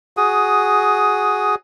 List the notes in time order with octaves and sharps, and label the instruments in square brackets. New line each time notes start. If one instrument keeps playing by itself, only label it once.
[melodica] F#4 G#4 D#6